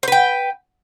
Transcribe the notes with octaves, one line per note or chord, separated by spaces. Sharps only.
B4 C5 G5